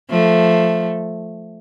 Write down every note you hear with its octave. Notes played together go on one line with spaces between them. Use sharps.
F3 A3